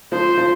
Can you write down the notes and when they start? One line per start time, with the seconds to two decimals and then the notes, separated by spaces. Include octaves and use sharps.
0.12 F3 C5
0.38 F3